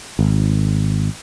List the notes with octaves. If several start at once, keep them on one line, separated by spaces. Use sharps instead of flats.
G#1